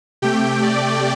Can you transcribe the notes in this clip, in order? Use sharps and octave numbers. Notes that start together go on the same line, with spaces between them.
C3 A3 G4 G5
D5